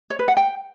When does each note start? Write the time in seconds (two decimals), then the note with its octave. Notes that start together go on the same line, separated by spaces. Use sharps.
0.10 C#5
0.19 B4
0.28 F#5
0.37 G5